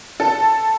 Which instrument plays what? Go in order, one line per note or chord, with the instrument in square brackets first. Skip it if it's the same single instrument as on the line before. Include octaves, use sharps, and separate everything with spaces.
[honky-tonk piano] A4